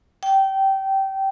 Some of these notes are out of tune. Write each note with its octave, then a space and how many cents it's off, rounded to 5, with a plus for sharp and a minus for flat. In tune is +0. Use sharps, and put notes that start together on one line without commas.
G5 -20